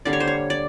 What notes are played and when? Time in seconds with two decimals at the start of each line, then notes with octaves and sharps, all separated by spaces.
0.05 D3 G3 A#3 D5
0.13 C#5
0.20 C5
0.27 C#5
0.50 D5